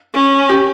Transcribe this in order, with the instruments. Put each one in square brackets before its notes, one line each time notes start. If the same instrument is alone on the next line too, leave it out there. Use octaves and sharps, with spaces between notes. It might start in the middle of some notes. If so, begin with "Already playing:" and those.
[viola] C#4
[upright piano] G4